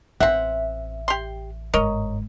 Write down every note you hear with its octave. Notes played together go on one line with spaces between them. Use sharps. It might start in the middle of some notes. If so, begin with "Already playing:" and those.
A1 C4 E5 F#5
G4 C6
G1 G#2 A#4 C#5 D#5